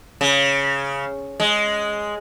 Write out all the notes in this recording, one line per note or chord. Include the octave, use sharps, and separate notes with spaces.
C#3
G#3